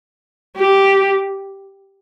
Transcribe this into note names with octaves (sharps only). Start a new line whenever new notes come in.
G4